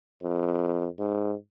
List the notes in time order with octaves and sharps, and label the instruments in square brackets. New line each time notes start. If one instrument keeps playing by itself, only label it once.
[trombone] F2
G#2